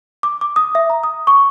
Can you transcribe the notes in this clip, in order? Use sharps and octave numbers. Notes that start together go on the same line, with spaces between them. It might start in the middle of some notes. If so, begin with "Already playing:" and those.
D6
D6
D#6
E5
A#5
D#6
C#6